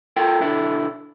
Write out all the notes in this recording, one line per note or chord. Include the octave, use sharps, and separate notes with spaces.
F4 A4 A#4 G5
B1 D3 E4 A4